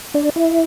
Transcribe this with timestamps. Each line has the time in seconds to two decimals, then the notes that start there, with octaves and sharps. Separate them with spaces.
0.14 D4 D5
0.36 E4 E5